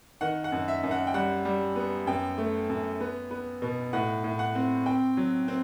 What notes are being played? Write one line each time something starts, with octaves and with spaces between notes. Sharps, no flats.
D#3 F#5
F#5
F#2
E5
F#2
F#5
G5
G3 F#5
G3
B3
F#2 G5
A3
F#2
B3
B3
B2
A2 F#5
A2
F#5
C4
C4 G5
F#3
C4